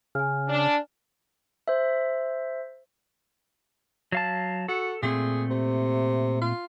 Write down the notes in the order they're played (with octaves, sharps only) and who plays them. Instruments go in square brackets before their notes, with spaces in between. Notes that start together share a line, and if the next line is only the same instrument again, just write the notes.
[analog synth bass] C#3 [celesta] G#5 F6
[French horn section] D4
[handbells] C5 E5
[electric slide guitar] F#3 F5 A5
[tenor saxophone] F#4 [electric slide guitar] A4
[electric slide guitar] A#2 A3 C4 [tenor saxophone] G#4
[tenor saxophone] C3
F4